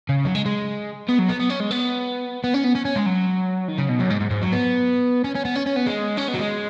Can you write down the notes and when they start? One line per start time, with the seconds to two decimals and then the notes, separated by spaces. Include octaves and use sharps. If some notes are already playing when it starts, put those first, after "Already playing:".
0.09 C#3
0.25 F#3
0.35 G#3
0.46 G#3
1.08 B3
1.19 F#3
1.28 B3
1.39 B3
1.50 C#4
1.60 G#3
1.71 B3
2.44 B3
2.54 C#4
2.64 B3
2.75 C#4
2.85 C#4
2.96 G#3
3.06 F#3
3.69 D#3
3.78 C#3
3.89 B2
4.00 F#2
4.10 G#2
4.21 G#2
4.31 G#2
4.42 F#3
4.52 B3
5.24 C#4
5.35 C#4
5.45 B3
5.56 C#4
5.66 C#4
5.76 B3
5.87 G#3
6.18 C#4
6.28 B3
6.35 F#3
6.39 G#3